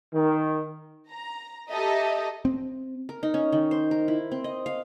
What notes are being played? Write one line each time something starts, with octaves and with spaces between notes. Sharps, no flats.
D#3
A#5
G4 A4 D#5 E5 A#5
C4
A#4
D#4
C#4
D#3
C5
A#4
E4
C4
D#5
F5